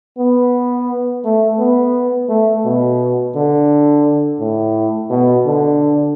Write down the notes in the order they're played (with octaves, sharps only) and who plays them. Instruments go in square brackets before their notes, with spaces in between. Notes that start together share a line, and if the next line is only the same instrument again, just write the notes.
[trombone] B3
A3
B3
A3
B2
D3
A2
B2
D3